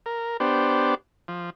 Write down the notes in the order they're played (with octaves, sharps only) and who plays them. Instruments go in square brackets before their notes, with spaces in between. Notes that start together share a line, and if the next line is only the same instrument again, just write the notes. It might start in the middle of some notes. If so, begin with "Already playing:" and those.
[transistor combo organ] A#4
B3 D4 G4 C5
F3